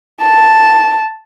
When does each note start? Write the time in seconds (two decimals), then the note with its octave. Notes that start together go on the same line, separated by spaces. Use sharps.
0.21 A5